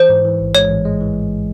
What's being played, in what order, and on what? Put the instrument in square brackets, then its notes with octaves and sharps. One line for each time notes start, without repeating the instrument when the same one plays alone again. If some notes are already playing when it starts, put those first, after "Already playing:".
Already playing: [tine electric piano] E3 [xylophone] C5
[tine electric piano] G#2
E3
A1
[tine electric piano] G#3 [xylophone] C#5
[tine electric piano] A1
G#3
E3